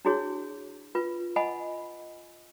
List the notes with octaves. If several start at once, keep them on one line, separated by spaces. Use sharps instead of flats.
D4 E4 F#4 G#4 C#5
F4 B4
D#5 F#5 G#5 B5